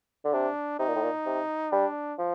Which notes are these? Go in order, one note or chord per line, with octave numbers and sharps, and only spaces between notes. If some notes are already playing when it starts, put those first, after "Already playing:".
D3
C3 D4
C3 D#4
A#2
A2
A#2
C3
G3 D4
F3